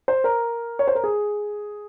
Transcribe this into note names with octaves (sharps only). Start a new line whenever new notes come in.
C5
A#4
C#5
C5
A#4
G#4